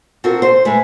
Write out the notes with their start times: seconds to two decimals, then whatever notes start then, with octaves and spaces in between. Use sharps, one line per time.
0.24 C4 F4 F#4 A4 A#4
0.42 C5
0.65 A2 G#3 B4